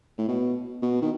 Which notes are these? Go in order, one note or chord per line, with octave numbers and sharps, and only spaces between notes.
A2
B2
B2
D#3